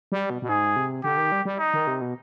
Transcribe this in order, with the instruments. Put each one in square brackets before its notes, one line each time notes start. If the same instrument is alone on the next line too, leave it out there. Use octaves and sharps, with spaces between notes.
[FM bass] G3
B2
B2
[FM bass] G#2 [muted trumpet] G#4
[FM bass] C3
[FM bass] D3 [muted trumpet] G4
[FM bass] D#3
G3
G3
[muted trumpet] D#4
[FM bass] D#3
C3
B2